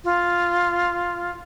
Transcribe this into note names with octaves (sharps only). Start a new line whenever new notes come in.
F4